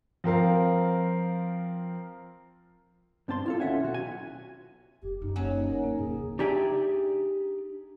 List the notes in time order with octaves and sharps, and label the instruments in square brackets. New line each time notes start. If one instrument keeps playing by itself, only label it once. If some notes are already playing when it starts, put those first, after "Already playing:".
[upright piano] F3 C4 A#4 F5
[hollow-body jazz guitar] G2 C4 D4 A5 C6
E4 F4 A4
D#2 C#4 E5 F#5 G#5
B1 F#4
G#5
[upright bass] F1 [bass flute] G4
[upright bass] F#1 [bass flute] D#4
[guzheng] F#3 C#4 [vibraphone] A#3 C#5
[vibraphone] A#4 F#5 G#5
[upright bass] F2 C4 [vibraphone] A#3
[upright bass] E2 C#3 [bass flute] G#4
[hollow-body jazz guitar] D4 D#4 G4 G#4 D5 E5